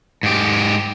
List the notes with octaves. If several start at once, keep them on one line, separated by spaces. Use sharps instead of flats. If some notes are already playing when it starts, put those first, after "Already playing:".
G#2 G4